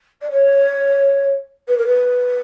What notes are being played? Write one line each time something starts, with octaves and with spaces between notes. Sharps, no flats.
D5
C#5
B4
A#4
B4